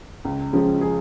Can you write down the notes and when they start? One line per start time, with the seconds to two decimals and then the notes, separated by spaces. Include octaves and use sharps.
0.25 C#2
0.53 C#3 F3 G#3
0.81 G#4